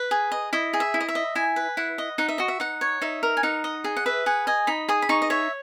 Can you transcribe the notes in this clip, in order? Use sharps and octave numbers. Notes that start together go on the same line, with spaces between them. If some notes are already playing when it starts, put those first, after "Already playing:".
Already playing: B4
G#4
D#5
E4 D#5
G#4
E5
E4
D#5
E5
D#5
E4 G#5
B4
E4 F#5
D#5
D#4 F#5
E5
F#4 D#5
E5
D#4 F#5
C#5
D#4 E5
A#4
G#5
D#4 F#5
D#5
G#4
F#5
B4 E5
G#4 F#5
D#5 G#5
D#4 B5
G#4 D#6
B5
D#4 C#6
D#5
C#5 E5